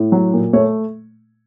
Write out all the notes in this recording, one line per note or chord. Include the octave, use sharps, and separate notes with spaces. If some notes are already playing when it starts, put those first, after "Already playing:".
Already playing: A2
F#3
A#2
A3 C#5